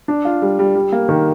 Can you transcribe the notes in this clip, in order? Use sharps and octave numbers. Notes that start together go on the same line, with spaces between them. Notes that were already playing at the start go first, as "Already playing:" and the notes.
D4
F4
G3
G3
G3
A#3
D#3